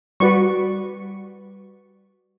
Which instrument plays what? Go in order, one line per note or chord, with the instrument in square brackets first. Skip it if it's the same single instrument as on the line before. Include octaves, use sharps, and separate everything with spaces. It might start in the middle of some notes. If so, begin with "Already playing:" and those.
[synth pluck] G3 F#4 [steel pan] B4 D5 C#6